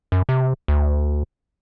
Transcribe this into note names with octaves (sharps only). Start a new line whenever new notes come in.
F#2
C3
D2